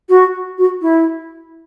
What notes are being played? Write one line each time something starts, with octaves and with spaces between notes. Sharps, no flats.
F#4
F#4
E4